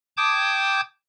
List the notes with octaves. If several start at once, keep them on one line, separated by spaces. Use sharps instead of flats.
G5 A5 D6 D#6 G6 G#6